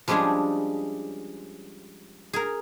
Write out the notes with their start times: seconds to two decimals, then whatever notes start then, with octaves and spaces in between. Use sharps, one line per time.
0.08 F3 G3 G#3 C#4 D4 G#4
2.33 G#4 A#4